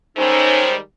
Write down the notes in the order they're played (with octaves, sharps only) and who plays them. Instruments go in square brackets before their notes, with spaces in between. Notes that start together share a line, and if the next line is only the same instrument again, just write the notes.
[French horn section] D#3 G3 G#3 [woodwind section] C#4 D#4 A4 [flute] C5